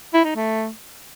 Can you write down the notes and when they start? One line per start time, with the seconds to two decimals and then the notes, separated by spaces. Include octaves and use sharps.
0.14 E4
0.25 D#4
0.36 A3